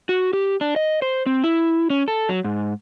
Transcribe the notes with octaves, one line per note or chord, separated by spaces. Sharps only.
F#4
G4
D4
D#5
C5
C4
E4
C#4
A4
F#3
G#2